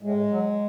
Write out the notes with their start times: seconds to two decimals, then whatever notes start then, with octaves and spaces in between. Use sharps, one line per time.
0.02 A2 G#3
0.29 F#3